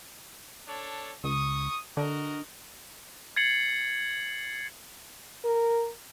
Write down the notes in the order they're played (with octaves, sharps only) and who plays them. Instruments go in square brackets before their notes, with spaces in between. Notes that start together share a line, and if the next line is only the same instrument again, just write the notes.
[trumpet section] D4 A4 C#5
[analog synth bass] C#2 [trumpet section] C#6 D#6
[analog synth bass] D3 [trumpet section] F#4 A#4 D#5
[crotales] G#6 A6 C7 C#7 F#7
[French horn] A#4